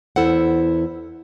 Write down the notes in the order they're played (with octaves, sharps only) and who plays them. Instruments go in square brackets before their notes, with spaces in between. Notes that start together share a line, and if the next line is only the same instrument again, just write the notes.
[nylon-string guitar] E2 E4 A4 C5 F#5